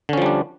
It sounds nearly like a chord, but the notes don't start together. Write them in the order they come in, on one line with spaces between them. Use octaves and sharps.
D3 C#4 F3 G3 D4